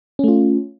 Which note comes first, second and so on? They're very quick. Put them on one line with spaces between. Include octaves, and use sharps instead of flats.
C#4 A3 F4